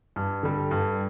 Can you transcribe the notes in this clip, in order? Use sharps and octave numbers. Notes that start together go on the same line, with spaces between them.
G2
D3 G3
G2